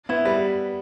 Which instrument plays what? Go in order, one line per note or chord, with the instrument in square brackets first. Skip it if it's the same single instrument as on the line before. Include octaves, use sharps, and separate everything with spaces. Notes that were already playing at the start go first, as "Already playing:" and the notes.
[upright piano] B3 [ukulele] E4
[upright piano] G3 [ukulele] B4